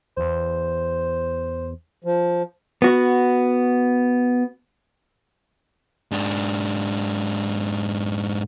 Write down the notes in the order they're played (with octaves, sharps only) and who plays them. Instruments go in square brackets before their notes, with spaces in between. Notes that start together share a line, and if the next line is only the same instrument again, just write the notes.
[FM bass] E2 [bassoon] C5
[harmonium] F3
[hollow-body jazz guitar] B3 F#4
[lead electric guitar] G#2 D4